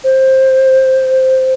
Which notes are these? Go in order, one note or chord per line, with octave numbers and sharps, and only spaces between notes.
C5